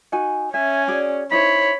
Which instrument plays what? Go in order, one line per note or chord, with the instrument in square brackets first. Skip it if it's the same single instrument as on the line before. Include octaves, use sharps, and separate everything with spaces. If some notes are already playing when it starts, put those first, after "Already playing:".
[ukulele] D#4 F#4 G#5
[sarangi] C#4 [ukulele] E5 [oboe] G#5
[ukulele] F#4 G#4 D5
[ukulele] D#4 E4 C5 [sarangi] C#5 [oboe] B5